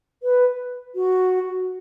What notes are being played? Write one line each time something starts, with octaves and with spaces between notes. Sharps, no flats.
B4
F#4